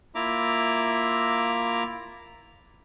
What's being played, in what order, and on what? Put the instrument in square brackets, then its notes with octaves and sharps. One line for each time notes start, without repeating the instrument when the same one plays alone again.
[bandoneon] A#3 E4 F4 E5 A#5 D6